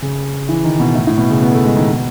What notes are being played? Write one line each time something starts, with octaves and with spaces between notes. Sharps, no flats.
C#3
E3
D#3
B2
A2
A2
B2
C#3
B3
A3
G#3
D#3
B2